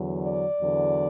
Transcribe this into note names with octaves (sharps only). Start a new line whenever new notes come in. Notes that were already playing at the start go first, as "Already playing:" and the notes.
Already playing: E2 D3 F#3
D5
E2 D3 F#3